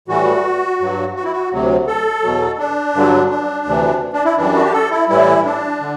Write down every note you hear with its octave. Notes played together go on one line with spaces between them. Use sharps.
A2 E3 G3 F#4
G2 F#3
F#4
E4
F#4
D2 C3 F#3
A4
E2 B2 F#3
D4
G2 D3 F#3
D4
D2 C3 E3
D4
E4
F#2 E3 G3 D4
F#4
G4
A4
E4
A2 E3 G3 E4
D4
D3